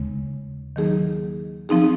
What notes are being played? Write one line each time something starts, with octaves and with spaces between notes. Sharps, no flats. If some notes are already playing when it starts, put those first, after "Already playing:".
Already playing: D#2 C#3 G#3
D#3 F#3 A#3 D#4 G#4
F3 C4 D#4 G#4